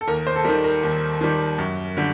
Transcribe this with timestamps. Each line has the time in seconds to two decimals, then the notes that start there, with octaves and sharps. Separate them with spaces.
0.01 A4
0.08 D#2 A#4
0.27 C5
0.36 A4
0.44 D#3 G3 A#4
0.64 A#4
0.83 D#2
1.21 D#3 G3
1.58 F#2
1.97 D3 G3